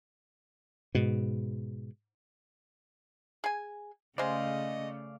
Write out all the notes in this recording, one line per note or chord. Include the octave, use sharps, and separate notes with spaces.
G#2 B2
G#4 G#5
C#3 G#3 A3 C#4 C5 D5 D#5 F5